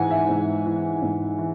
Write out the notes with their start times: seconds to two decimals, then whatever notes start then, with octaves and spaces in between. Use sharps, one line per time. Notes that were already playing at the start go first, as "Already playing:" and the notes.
Already playing: G#2 E3 F#5 G#5
0.11 E5
0.29 G#2
0.66 E3
1.02 G#2
1.38 E3